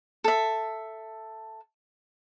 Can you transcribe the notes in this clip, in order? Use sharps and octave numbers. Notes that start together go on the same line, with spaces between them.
A4 E5